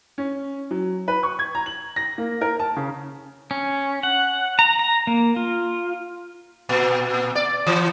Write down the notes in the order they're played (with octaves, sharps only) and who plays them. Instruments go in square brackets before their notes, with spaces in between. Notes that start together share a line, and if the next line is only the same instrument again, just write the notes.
[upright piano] C#4
F#3
B4
C#6
G#6
A#5
F#7
A#6
A#3
A#4
A5
C#3
[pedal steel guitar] C#4
F#5
A#5
A#5
A#3
F4
[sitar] A#2
D5
E3